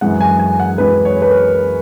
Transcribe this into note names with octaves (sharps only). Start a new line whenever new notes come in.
F#2 E3 G#3 F#5
G#5
G#5
F#5
F#2 E3 G#3 B4
C#5
B4
A#4